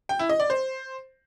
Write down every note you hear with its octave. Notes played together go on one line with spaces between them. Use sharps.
G5
E4
D#5
D5
C5